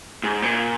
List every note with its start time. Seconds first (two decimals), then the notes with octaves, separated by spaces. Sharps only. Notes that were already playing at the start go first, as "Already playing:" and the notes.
0.24 G#2
0.42 A#2